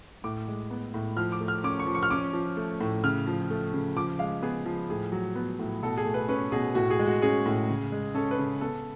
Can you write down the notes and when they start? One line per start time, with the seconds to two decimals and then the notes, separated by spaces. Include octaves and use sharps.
0.24 A2 D6
0.48 G#3
0.71 B3
0.94 A2
1.17 F3 F6
1.32 D6
1.40 A3
1.48 F6
1.64 C#4 D6
1.80 C#6
1.87 F3
1.95 C#6
2.03 F6
2.11 C#4 D6
2.33 F3
2.57 A3
2.81 A2
3.04 C#3 F6
3.27 F3
3.50 A3
3.73 C#3
3.96 F3 D6
4.19 G#3 F5
4.42 B3 G#4
4.66 F3
4.90 A2 G#4
5.12 F#3
5.36 B3
5.59 A2
5.83 B2 A4
5.97 G#4
6.05 A3
6.14 B4
6.28 C#4 B4
6.52 B2 G#4
6.75 A2 F#4
6.90 G#4
6.99 G#3
7.06 F#4
7.22 C#4 G#4
7.46 A2
7.69 C#3
7.92 G#3
8.15 C#4 A4
8.31 B4
8.38 C#3
8.61 B3 A4